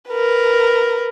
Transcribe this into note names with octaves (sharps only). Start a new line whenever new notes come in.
A#4 B4